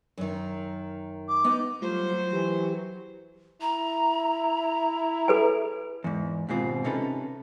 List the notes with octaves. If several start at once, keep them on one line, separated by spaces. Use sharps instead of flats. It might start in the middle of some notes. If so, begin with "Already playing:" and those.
F#2 D#3
D6
B3 D#4
F#3 G3 A3 F4 C5
E3 G4
E4 A#5
A4 B4 G#5
E2 G#2
D#2 G#2 B2 C4 F4
C3 C#4 D#4 A4 B4